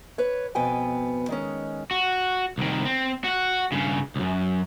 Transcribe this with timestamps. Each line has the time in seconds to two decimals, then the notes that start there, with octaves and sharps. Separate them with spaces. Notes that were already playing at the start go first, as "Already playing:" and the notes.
0.18 B4 C#5
0.55 F2 B2 B3 G5 G#5
1.28 D#3 G#3 C#4
1.91 F#4
2.58 C2 D#3
2.85 C4
3.24 F#4 F#5
3.72 G2 C#3
4.16 C#2 F#2